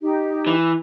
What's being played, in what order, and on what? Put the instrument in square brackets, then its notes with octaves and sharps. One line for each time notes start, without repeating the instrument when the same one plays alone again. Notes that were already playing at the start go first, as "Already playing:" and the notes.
[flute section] D#4 G4
[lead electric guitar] E3